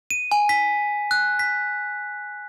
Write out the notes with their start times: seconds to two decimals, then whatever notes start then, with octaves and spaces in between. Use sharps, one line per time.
0.11 D#7
0.32 G#5
0.49 B6
1.11 F#6
1.39 B6